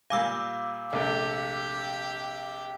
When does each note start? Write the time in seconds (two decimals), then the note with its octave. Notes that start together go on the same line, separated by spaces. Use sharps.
0.10 A#2 G3 F5 G#5 D6 E6
0.93 A#1 C3 A3 G4